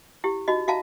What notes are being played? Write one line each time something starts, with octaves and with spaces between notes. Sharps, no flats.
E4 G4
D#4 F#4 D#5
F#4 E5 F5 A5 A#5